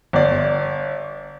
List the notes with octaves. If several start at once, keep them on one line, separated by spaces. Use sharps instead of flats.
G1 D5